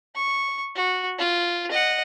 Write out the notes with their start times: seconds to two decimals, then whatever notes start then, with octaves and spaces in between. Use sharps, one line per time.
0.15 C#6
0.76 F#4
1.19 F4
1.71 D#5 F#5